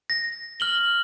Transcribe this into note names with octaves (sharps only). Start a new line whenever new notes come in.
A#6
F6 F#7 G7